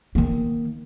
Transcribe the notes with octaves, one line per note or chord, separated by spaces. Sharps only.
D#3 A#3